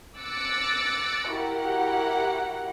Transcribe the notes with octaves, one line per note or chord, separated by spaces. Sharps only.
D6 E6 F#6 A6 A#6 C#7
E4 F#4 G4 A#4 F#5